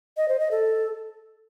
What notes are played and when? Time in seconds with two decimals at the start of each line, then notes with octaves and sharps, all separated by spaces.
0.17 D#5
0.28 C5
0.40 D#5
0.51 A4